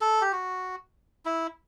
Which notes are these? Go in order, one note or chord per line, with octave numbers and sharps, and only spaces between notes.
A4
G4
F#4
E4